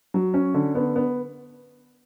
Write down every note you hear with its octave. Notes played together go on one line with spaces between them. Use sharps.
F#3
C#4
D3
B3
B3